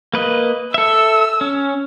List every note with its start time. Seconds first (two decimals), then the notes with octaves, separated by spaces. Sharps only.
0.14 A#3 B4 D#5
0.74 A4 E5 E6
1.41 C#4